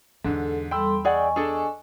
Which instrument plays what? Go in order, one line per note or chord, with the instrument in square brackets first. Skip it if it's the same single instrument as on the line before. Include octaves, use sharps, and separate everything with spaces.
[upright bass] E2 [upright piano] G#2 D3 [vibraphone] A4
[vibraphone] G3 A4 C6 [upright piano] G5 B5 E6
[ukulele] G#4 D5 F#5 [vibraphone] D#5 G#5 C#6
[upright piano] D4 A4 [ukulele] G#4